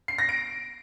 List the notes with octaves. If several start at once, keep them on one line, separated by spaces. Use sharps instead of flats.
C7
A#6
D7